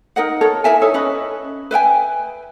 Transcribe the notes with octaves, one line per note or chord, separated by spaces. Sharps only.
D#4 A#4 D#5 F#5
A4 A#4 C#5
E4 A#4 E5 G#5
D#4 A4 C#5
C#4 B4 D#5
B4 E5 G5 G#5